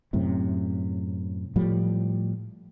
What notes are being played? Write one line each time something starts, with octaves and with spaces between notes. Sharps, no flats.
F#2 A2 C3
A2 F3 G3